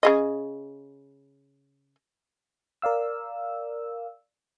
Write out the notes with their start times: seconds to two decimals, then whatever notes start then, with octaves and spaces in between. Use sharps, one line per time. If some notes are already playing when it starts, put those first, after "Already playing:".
0.03 C#3 G#4 D#5
2.82 A#4 D5 F5 E6